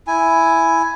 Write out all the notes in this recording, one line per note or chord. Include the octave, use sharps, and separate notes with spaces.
E4 G#5